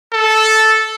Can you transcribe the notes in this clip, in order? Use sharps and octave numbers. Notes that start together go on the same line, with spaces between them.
A4